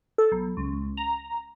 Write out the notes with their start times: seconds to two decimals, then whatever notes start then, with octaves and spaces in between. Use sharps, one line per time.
0.18 A4
0.32 B1
0.57 C#2
0.97 A#5